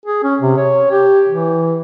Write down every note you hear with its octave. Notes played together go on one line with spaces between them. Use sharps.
G#4
C#4
C3
C#5
G4
E3